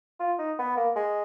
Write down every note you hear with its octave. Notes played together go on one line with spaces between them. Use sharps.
F4
D#4
B3
A#3
G#3